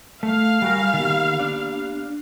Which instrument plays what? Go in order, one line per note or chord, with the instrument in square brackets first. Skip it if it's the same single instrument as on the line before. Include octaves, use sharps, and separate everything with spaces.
[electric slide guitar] A3 [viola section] F5
[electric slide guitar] G3 F#4 A#4 [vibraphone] G#5
[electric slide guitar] D#3 [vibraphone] A#3 B3 G4
[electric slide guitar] D4